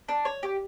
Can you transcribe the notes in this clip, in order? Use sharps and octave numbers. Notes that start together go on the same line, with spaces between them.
D4
C#5
G4